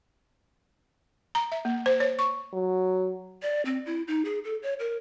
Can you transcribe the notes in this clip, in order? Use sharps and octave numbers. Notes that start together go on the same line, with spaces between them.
A#5
E5
A#3
C5
C#5
C#6
F#3
D5
C4
E4
D#4
G#4
A4
C#5
A#4